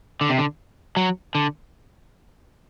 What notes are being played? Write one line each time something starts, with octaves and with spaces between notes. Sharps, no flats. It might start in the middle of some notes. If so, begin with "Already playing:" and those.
D3
C3
D3
F#3
D3